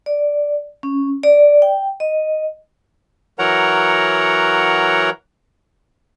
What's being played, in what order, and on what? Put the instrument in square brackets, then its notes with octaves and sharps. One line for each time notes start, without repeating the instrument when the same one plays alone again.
[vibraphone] D5
C#4
D5
G5
D#5
[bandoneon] E3 F#3 A#4 C#5 F#5 A#5